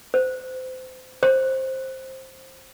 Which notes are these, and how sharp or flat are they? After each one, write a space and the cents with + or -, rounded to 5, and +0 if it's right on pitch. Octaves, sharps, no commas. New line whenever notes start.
C5 -30
C5 +10